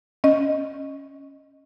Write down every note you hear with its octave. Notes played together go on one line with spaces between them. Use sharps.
C#4 D#5